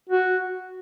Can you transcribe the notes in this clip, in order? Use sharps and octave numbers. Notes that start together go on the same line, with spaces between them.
F#4